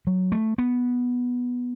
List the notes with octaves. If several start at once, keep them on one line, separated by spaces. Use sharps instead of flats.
F#3
A3
B3